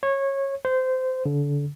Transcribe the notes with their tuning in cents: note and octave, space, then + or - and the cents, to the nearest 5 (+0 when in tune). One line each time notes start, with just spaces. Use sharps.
C#5 -20
C5 -20
D3 -30